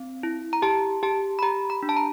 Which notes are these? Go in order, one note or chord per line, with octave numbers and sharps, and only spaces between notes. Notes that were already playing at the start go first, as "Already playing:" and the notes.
Already playing: C4
E4
A#5
G4 A5
G4 A5
B5
G4 A#5
B5
D4
A5
A#5